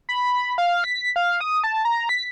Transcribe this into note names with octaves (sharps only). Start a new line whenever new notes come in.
B5
F5
B6
F5
D#6
A5
A#5
B6